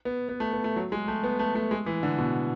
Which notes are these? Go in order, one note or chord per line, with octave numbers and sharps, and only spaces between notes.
B3
B3
A3
B3
A3
F#3
G#3
A3
B3
A3
A3
G#3
E3
D3
B2